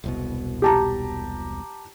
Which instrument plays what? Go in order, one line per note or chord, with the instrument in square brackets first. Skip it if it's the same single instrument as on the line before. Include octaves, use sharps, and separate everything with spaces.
[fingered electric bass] E1 C2 B2
[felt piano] G4 A5 A#5